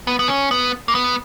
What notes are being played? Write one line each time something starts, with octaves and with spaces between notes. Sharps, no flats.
B3
B3
C#4
B3
A#3
B3